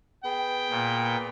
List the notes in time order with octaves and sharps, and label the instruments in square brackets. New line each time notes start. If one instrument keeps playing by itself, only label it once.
[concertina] B3 G#4 B4 [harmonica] G5
[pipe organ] A#2